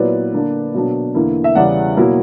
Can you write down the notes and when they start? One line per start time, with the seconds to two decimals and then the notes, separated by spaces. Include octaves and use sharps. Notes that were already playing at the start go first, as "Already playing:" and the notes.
Already playing: A#2 F#3 B3 E4 B4 D5
0.33 D3 A#3 D4
0.74 B2 F#3 A#3 D4
1.15 E2 D3 A#3 E4
1.44 E5
1.55 E2 C#3 G3 D5 F#5
1.97 B2 F#3 A#3 E4